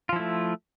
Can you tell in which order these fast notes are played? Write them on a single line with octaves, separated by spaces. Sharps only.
F4 F3 E4 A3